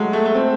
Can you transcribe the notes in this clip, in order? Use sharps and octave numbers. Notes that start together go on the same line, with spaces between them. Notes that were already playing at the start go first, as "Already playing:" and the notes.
Already playing: F#3 G#3 A3
A3
A3
C4